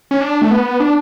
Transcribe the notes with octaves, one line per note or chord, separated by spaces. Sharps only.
C#4
D4
A3
B3
D4